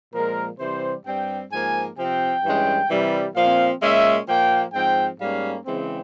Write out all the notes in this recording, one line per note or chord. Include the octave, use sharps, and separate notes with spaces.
A#2 F3 G#3 A#4
C3 E3 G3 C5
G2 G3 C4 G5
G#2 F3 A#3 G#5
C3 F3 C4 G5
G2 E3 G#3 C#4
C3 E3 G3
A#2 F3 C4 F5
A#2 G#3 C#4 E5
A#2 F3 A#3 G5
G#2 F3 C4 G5
G#2 G3 A#3 C#4 F5
C#3 E3 G#3 C4